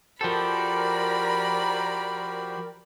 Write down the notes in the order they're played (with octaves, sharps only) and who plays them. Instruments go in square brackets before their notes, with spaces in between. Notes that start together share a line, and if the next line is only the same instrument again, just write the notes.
[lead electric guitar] F3 A4 [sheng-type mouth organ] F#4 G4 C5 [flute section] A#4 [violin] D5 B5